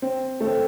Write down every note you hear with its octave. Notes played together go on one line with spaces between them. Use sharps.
C4
A3
C4